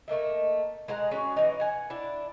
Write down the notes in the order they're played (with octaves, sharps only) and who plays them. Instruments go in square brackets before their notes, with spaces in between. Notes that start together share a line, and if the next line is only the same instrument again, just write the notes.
[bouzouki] A3 A#3 D#4 E5
G#3 G#4 F#5 A#5
C#4 F#4 G#4
E3 D#4
F#5 G#5
D4 E4